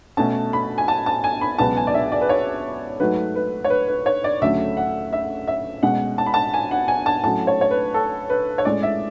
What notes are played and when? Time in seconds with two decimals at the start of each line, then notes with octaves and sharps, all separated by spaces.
0.17 B2 A3 C#4 A5
0.53 B5
0.78 G#5
0.88 A5
1.06 A5
1.24 G#5
1.41 B5
1.58 C#2 B2 F#3 B3 A5
1.77 G#5
1.87 D5
1.94 E5
2.12 D5
2.21 B4
2.29 C#5
3.00 G#2 F#3 A3 B4
3.35 B4
3.64 C#5
3.70 B4
3.88 B4
4.06 C#5
4.24 D5
4.42 D2 C#3 F#3 A3 E5
4.77 F#5
5.13 E5
5.47 E5
5.83 B2 G#3 C#4 F#5
6.18 A5
6.26 B5
6.34 A5
6.54 G#5
6.71 F#5
6.88 G#5
7.06 A5
7.23 A2 F#3 C#4 A5
7.47 C#5
7.61 C#5
7.71 B4
7.94 A4
8.30 B4
8.58 C#5
8.65 A2 G#3 C#4 D5
8.83 E5